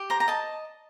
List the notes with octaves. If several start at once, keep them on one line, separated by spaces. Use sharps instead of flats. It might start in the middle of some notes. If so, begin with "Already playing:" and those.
Already playing: G4
C5 A#5
A#5
D#5 A5